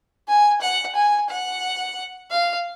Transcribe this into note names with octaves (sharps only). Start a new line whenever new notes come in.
G#5
F#5
G#5
F#5
F5